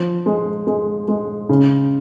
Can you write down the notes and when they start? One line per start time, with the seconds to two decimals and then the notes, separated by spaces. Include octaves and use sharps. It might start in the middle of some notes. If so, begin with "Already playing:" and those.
Already playing: F3
0.26 G#3
0.67 G#3
1.08 G#3
1.49 C#3